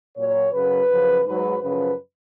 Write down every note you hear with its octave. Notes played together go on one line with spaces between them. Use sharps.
A#2 F#3 C#5
F#2 C#3 F#3 B4
F#2 C#3 F3
G#2 F#3 B4
F#2 C#3 F3 B4